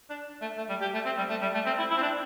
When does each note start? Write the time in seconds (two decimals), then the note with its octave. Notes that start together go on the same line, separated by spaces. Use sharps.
0.09 D4
0.41 A3
0.57 A3
0.69 G3
0.81 G4
0.94 A3
1.05 C4
1.17 G3
1.30 A3
1.42 G3
1.54 A3
1.66 C4
1.78 E4
1.90 E4
1.97 C4
2.02 D4